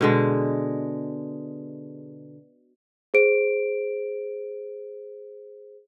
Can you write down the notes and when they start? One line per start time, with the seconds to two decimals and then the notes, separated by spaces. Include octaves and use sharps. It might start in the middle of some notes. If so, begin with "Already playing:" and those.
0.01 B2 D3 G#3
3.14 G#4 C5 D7